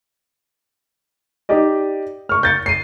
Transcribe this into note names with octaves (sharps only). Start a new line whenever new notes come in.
D#4 G4 D5 D#5
C#6 F6
G6 A6 C#7
C7 D#7